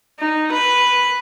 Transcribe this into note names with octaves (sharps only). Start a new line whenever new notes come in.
D#4
B4